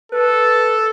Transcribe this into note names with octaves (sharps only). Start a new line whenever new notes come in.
A4 B4